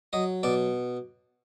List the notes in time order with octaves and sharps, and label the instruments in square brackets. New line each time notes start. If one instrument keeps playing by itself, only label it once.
[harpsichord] F#3 D#5
B2 D5